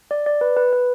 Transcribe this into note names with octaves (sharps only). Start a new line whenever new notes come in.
D5
D5
B4
B4
B4